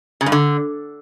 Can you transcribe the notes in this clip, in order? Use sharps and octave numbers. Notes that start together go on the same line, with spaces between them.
C#3
G2
D3